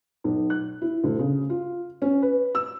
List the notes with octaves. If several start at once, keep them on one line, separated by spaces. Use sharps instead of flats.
B1
F#6
E4
D2
C#3
F4
C#4
B4
E6